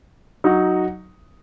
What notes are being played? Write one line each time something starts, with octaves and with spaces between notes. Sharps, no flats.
F#3 D#4 F#4